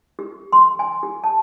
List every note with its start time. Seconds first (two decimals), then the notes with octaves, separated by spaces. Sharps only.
0.19 G4
0.53 C6
0.79 G#5
1.03 G4
1.24 A5